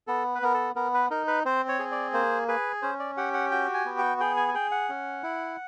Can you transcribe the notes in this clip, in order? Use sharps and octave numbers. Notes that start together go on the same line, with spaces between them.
B3 A4
B4
B3 A#4
A4
B3 A#4
B4
D#4 A#4
B4
C4 C5
C#5
G#4
D5
A#3 C5
G#4 B4
C#4 C5
D5
G4 F#5
F#5
F#4 G5
G#5
B3
G5
G#4 G5
G#5
G#5
G#4 G5
F#5
C#4
E4